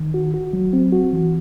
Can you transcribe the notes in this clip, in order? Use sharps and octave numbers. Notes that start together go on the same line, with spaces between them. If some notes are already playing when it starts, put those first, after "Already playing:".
Already playing: D#3
F#4
F#4
F#3
C4
F#4
E3